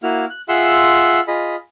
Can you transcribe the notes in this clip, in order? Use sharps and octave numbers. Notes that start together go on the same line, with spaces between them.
A#3 E4 F#4 F6
F#6
F4 G#4 E5 F#5 C6 E6
F4 G#4 D#5 B5